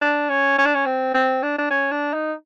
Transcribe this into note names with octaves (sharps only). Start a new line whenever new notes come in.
D4
C#4
C#4
D4
C#4
C4
C4
D4
D4
C#4
D4
D#4